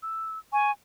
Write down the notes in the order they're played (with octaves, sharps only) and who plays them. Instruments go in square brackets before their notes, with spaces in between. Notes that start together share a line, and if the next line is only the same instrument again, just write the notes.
[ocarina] E6
[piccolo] G#5 [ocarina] C#6